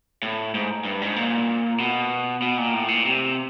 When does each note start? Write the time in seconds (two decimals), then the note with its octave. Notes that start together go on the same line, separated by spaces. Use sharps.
0.22 A2
0.54 G#2
0.85 G2
1.01 G#2
1.16 A#2
1.80 B2
2.42 B2
2.58 A#2
2.74 A2
2.88 A#2
3.05 C3